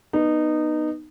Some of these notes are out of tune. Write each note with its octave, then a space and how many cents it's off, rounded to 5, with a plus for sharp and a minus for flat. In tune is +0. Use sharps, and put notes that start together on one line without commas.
B3 -10 D#4 -20